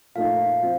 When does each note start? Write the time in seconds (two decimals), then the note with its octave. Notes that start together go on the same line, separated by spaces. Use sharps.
0.15 A#2 F3 A3 D#4 F5
0.63 F3 C4